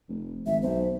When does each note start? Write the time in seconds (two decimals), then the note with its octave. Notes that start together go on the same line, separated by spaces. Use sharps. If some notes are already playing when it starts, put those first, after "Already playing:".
0.08 F1
0.46 G#1 E5
0.62 B1 C5